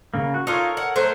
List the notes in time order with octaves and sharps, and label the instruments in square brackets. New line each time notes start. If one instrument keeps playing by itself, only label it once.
[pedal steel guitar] C#3 A#3
F#4
[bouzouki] D#4 F4 [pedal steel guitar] A4 A#4 C#5
[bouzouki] F#5
F#3 A3 C5